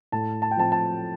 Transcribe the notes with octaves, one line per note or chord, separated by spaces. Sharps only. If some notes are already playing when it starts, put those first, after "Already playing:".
A2 A5
A5
G5
F3 C4 A5
A5